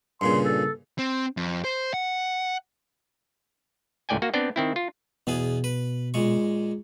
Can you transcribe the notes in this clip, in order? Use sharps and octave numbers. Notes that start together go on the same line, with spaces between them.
G2 A#2 C#3 C6
A4
C4
F2
C5
F#5
C#2 A2 D5 G5 G#5
A#3 F#4
B3 C4 D4 D5 G5
D#3 C4 E4
F4
E2 B2 B3 G#4
B4
A#2 G#3 C#6